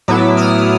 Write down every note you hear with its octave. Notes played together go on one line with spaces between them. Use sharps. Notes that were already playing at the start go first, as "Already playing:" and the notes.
A2 F#3 B3 E4 D6 E6
D#6 F6